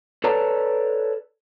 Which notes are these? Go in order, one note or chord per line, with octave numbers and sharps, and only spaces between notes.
A4 B4 C#5 D5 A5 A#5